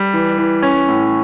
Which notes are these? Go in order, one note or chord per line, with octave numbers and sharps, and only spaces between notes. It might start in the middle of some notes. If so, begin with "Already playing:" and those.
Already playing: G3
E3
E3
C#4
A2